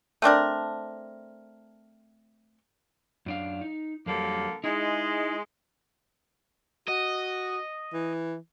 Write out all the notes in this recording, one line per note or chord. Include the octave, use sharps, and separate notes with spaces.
A3 C4 D4 A#4
F#2 D4 F5
D#4
F2 D3 F#3 G3 A#3
G#3 D#4 E4
F#4 D#5
E3